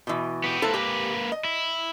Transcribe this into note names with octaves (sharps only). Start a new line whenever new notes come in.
B2 E3
B3 G4
A#3 E4 A4 B4 C5
G4 G#5
D#5
E4